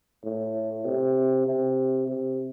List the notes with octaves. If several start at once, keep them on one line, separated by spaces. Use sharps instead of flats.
A2
C3
C3
C3